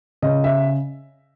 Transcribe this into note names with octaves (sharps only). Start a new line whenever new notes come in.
C#3 D#5
E5